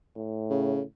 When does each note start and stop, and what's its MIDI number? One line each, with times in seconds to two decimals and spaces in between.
0.16 0.84 45
0.50 0.81 49